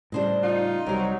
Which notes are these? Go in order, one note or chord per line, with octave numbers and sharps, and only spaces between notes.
A2 C#3 G3 D4 C5 D#5
D#4 F4
C2 F#3 G3 A#4 C5